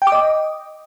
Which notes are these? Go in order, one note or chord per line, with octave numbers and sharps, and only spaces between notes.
G5
D6
D#5